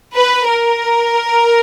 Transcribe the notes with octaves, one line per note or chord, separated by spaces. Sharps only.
B4
A#4